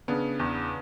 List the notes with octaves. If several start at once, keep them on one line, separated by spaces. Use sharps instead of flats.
C#3 B3 D4
E2